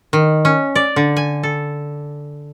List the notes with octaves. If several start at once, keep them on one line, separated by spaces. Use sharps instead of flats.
D#3
C#4
D5
D3
G#5
A4